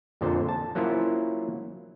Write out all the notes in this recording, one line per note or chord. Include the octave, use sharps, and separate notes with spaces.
F2 A#2 D3 C5 A5
A5
F#3 A#3 C#4 E4 F4 C5